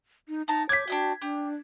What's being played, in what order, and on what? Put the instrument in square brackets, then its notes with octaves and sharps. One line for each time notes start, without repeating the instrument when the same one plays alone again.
[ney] D#4
[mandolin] B3 A5 A#5 [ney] D#4
[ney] C#5 [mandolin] D6 G6 [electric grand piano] G#6 B6
[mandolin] D4 D#5 G5 [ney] F#4
[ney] D4 [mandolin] G4